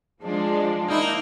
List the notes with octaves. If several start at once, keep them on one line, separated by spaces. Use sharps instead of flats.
F3 G#3 D4
A#3 D#4 E4